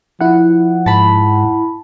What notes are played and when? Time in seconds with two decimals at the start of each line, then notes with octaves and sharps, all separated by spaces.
0.21 F3 E4 F#5
0.86 G#2 A5 B5